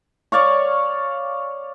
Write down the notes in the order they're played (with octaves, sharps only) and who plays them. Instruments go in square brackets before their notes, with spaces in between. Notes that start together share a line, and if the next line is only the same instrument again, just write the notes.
[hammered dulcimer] C#5 D5 F5 C#6